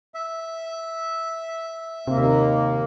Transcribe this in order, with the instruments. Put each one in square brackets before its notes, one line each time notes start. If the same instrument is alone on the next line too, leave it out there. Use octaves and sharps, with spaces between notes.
[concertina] E5
[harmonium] D#2 A#3 [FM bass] C3